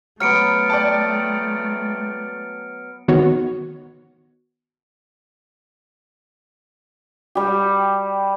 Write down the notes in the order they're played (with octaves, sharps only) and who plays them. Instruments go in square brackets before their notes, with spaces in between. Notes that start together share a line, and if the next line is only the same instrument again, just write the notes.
[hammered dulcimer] F#3 B3 [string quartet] A3 [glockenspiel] F6 C#7 D7
[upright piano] D5 G5 A5
[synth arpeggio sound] D#3 B3 F#4 C#5
[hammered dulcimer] G3 G4